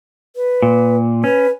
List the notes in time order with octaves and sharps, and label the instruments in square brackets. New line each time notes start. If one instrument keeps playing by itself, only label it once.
[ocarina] B4
[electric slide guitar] A#2
[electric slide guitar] C#4 [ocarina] B4